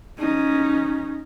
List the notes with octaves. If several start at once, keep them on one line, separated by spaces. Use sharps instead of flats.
C#4 D#4